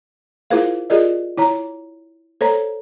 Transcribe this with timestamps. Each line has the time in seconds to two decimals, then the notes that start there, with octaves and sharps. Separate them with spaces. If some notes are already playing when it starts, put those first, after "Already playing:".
0.50 E4 F4 G#4 A#4 C5 F5
0.90 F4 G4 G#4 A#4 D5 D#5
1.37 E4 C#5 A#5
2.41 A4 C5 C#5 A#5